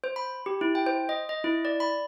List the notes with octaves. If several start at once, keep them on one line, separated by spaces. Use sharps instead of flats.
C5
B5
G4
E4
G5
C5
D#5
D#5
E4
D5
B5